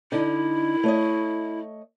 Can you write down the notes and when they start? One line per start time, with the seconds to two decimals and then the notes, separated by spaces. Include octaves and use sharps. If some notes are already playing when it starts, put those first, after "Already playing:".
0.12 D3 D#4 E4
0.84 A3 C#5 D#5